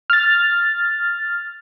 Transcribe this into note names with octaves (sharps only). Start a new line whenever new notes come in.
F6 A6